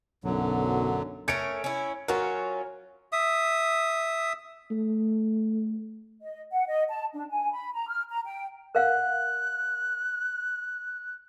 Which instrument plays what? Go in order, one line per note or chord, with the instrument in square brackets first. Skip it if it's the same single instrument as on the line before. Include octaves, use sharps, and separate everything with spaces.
[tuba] B1 [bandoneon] F#2 D3 F#3
[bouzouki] A3 C#4 A#4 [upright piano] G#6 C#7 D7
[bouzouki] C#4 E4
[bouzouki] F#3 C#4 F4 [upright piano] F#4 A#4
[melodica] E5 D#6
[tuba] A3
[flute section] D#5
F#5
D#5
A5
D4
G#5
B5
A#5
F6
A#5
G5
[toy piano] A#4 F5 F#5 [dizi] F#6